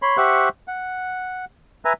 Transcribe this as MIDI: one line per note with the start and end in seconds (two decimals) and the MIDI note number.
0.02 0.17 73
0.02 0.17 83
0.02 0.17 84
0.17 0.49 67
0.17 0.49 72
0.17 0.49 76
0.17 0.49 78
0.17 0.49 85
0.17 0.49 90
0.68 1.45 78
1.85 1.93 71
1.85 1.93 76
1.85 1.93 80
1.85 1.93 82